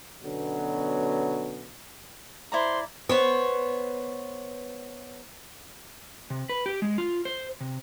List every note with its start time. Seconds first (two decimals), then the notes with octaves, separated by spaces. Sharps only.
0.24 B2 D3 F#3 B3 C#4
2.52 E4 C5 D5 A#5 C6
3.09 B3 C5 C#5
6.30 C3
6.49 B4
6.66 G4
6.82 G#3
6.98 F4
7.25 C5
7.61 C3